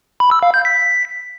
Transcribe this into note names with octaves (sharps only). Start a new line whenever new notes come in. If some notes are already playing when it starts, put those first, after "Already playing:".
B5
E6
F5
G6
B6